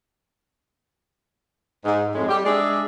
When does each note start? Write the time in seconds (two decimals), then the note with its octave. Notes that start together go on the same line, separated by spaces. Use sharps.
1.85 G#2
2.15 F2 A2 G#3
2.29 G3 G4
2.45 G#3 D4 G#4 D5 E5